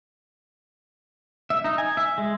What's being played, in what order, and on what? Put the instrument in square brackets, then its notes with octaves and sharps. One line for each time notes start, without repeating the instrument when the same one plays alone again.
[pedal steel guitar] E5
D#4
G#5
E5
G#3